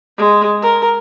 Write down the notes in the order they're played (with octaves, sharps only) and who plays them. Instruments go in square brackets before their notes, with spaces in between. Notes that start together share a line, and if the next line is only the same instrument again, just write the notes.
[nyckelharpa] G#3
A#4